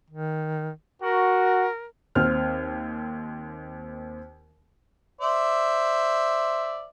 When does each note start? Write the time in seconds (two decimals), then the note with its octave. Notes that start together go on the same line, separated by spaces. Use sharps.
0.10 D#3
1.02 F#4 A#4
2.15 D#2 C4 F6
5.21 C5 D5 E5